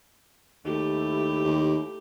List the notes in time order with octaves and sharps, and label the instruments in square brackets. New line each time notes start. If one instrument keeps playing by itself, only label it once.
[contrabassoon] D#2 [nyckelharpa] A3 G4 [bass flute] E4
[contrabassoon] D#2